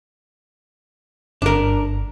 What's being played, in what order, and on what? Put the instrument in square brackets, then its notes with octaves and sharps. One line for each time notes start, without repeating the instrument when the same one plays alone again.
[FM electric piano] G1 [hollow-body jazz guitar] D4 A#4